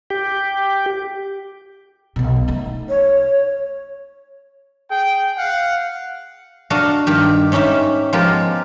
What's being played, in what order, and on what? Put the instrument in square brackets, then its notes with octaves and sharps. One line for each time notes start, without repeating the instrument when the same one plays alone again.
[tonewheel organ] G4
[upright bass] B1 B2
A3 D#4
[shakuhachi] C#5
[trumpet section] G#4 G5
F5 F#5
[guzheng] D4 F#4 A4 D#5 F5 A#5
G2 D#3 G4 A#4
G#2 C#4 D#4 G4 E5
F3 G#3 B3 F4 G4 A#4